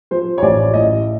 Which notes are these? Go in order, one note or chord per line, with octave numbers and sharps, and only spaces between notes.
F3 C5
C#5
A1 D5
A2 D#5